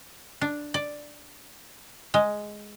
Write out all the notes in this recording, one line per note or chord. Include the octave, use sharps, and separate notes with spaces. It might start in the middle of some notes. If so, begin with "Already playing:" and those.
D4
D5
G#3